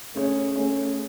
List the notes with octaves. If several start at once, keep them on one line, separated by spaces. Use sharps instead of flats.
A3 C#4 G#4 C#5
A3 C#4 G#4 C#5